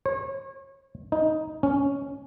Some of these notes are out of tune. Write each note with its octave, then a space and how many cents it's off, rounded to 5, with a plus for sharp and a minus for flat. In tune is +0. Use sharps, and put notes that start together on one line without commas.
C#5 -35
D#4 +10
C#4 +5